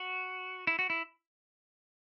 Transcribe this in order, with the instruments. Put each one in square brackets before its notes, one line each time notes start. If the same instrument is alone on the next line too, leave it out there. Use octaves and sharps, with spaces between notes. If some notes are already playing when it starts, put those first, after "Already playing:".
Already playing: [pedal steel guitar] F#4
E4
F#4
E4